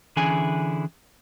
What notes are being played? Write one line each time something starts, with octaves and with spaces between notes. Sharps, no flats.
D3 E3 C#4 E4 G#4 G#5